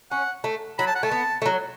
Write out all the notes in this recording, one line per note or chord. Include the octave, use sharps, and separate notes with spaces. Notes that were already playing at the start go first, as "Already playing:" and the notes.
C#4 F#5
A3
F#3 B5
A5
F#5
A3 A5
B3
A3
F#3